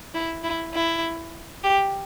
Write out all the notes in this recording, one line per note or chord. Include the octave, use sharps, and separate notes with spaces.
E4
E4
E4
G4